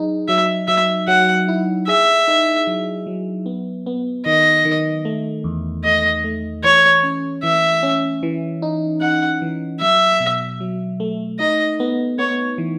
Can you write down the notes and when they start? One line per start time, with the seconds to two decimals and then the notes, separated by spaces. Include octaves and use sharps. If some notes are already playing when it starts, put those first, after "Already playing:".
Already playing: F#3 D#4 G#4
0.28 F#3 E5
0.68 F#3 E5
1.08 F#3 F#5
1.48 E4
1.87 G#4 E5
2.28 D#4
2.67 F#3
3.07 F#3
3.46 B3
3.86 B3
4.26 D#3 D#5
4.65 D#3
5.05 A3
5.44 E2
5.84 A3 D#5
6.24 A3
6.64 E3 C#5
7.03 C#4
7.43 E3 E5
7.83 C#4
8.23 E3
8.62 D#4
9.01 D#4 F#5
9.42 E3
9.80 F#3 E5
10.20 B2
10.60 F#3
11.00 A3
11.39 D#4 D#5
11.80 B3
12.19 B3 C#5
12.58 E3